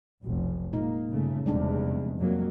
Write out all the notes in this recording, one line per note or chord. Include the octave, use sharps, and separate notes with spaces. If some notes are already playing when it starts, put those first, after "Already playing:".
F1 B1
A#2 G#3 A#3 D#4
G1 C#3 A3
F1 E2 C3 G3 G#3 D4
F2 F#3 A#3